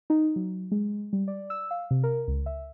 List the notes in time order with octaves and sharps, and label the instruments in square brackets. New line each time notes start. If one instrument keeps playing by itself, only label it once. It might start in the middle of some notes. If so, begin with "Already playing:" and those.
[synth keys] D#4
F#3
G#3
G3
D5
E6
F5
C3
A#4
C#2
E5